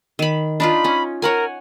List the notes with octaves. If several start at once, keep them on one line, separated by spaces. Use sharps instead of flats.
D#3 B5
D4 D#4 F4 B5
C#4
A#4 C#5 F#5 G#5